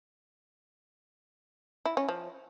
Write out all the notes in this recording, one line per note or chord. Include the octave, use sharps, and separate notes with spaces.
E4
C#4
F3